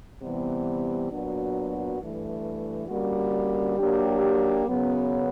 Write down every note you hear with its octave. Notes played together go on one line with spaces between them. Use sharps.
C3 E3 G3 B3
A#2 F#3 B3 D4 F#4
G2 E3 A3
D3 G3 A#3 C#4 F#4
F#3 A#3 D4 G4
F#2 C#3 F#3 B3